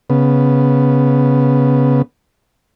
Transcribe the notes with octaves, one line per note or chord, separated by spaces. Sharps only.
C#3 B3